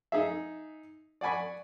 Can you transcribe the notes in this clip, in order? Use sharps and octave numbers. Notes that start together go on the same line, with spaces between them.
D#4 G#4 E5
D5 F#5 G#5 B5 C#6